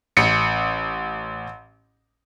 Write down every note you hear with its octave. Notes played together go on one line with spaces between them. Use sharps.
A1 C#7